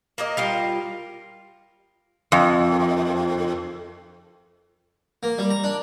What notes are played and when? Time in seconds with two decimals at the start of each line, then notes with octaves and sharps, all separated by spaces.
0.18 A#3 A#4 D#5
0.37 G3 F4 A#4
2.32 F2
5.23 A#3
5.38 G3
5.50 A#5
5.64 D4